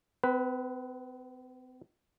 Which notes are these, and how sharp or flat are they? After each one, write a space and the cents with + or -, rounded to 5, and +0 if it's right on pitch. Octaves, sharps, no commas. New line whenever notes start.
C4 -45 B4 +0